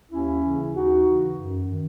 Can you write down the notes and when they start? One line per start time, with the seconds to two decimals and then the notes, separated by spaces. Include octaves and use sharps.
0.10 D#2 C#4 E4
0.42 C#3 E3
0.74 D#2 D#4 F#4
1.06 C#3 E3
1.38 F#2
1.71 D#3